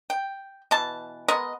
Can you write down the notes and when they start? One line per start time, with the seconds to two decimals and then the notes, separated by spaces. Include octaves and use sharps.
0.10 G5
0.71 B2 E3 A5
1.28 G#3 B3 A#4 D#5